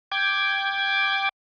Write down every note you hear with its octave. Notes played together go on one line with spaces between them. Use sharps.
G5 D6 G#6